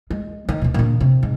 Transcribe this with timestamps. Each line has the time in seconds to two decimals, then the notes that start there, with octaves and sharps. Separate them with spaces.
0.10 G#3
0.49 D#3
0.62 D1 B2
0.74 A#2 D3
1.00 C3
1.23 G#2